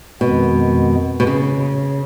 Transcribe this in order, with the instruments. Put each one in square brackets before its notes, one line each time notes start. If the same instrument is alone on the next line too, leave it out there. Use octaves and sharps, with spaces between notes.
[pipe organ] F2 D#3 G#3 B3 [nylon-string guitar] B2
[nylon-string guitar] B2
C#3